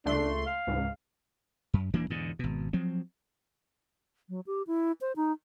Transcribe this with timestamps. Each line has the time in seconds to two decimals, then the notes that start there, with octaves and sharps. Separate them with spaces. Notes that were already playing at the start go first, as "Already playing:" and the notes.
0.05 C#2 A3 D4 C6
0.46 F5
0.67 C#2 G#2
1.74 F#2
1.94 D#1 E3 A#3 D4
2.10 E2 G#2 B2 D3
2.39 G#1 B2
2.73 F3 F#3 C4
4.29 F#3
4.47 G4
4.67 E4
5.01 C5
5.16 D#4